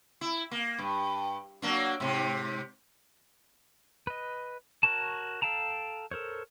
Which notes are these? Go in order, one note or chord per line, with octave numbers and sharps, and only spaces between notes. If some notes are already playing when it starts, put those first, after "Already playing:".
E4
A#3
G2
F#3 A#3 D4
G#2 C3
B4 D#5
F#4 A#4 C#5 A5
A4 F5 G5 A5 A#5
A4 A#4 C5 C#5